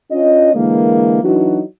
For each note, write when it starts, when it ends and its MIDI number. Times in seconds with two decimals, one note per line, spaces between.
0.11 0.54 61
0.11 0.54 62
0.11 0.54 65
0.11 0.54 75
0.55 1.18 50
0.55 1.18 52
0.55 1.18 56
0.55 1.18 58
1.23 1.60 52
1.23 1.60 54
1.23 1.60 62
1.23 1.60 63
1.23 1.60 66